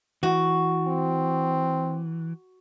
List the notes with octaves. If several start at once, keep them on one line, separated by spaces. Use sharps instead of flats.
E3 F#4
C4